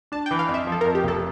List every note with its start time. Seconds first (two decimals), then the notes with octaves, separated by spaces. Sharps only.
0.12 D4 A5
0.26 G5
0.31 E3
0.39 F5
0.48 F2
0.54 E5
0.67 F3 A4
0.81 F2 A#4
0.95 G4
1.03 F1 A4